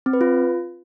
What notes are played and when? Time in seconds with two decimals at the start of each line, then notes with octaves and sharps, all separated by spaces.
0.06 C4
0.13 B4
0.21 F4